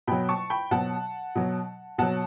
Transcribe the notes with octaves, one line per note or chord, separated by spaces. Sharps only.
B2 F#3 G5 B5
A5 C#6
G5 B5
B2 F#3 F#5 A5
B2 F#3
B2 F#3 F#5 A5